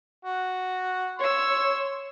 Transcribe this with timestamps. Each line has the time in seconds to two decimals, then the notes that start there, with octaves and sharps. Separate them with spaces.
0.25 F#4
1.19 C#5 C6 C#6 E6